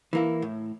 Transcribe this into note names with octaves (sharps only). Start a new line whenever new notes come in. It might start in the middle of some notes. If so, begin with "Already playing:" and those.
E3 A#3 E4
A2